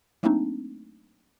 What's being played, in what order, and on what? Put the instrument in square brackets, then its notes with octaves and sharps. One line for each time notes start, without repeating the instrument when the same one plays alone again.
[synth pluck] F#3 A3 A#3 C4 D4 D#4